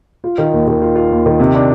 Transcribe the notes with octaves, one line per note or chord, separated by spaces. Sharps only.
F4
D#3
D#2
D#3
F4
F4
D#2
D#3
C3
D4